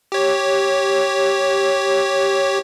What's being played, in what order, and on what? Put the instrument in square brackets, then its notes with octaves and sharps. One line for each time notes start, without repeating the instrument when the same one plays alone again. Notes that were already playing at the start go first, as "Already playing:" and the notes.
[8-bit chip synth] G4 C#5